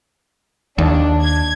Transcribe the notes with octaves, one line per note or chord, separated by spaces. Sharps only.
D#2 D4
G#6